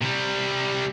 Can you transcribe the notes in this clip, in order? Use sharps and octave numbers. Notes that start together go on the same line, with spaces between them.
C3 G3